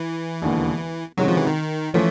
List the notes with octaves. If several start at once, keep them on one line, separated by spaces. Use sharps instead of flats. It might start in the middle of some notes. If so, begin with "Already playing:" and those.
Already playing: E3
E1 D#2 D3
C3 D#3 F#3 G#3 C#4 F#4
F3
E3
D#3
E3 F3 A3 C#4